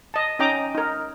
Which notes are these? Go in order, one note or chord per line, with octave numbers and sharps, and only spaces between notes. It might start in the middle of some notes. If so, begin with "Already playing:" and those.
D#5 A5
C#4 D#4 D#5 G5 A#5 D6
D#4 A#4